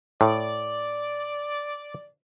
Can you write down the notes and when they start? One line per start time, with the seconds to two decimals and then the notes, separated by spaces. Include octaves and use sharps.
0.21 A2 D5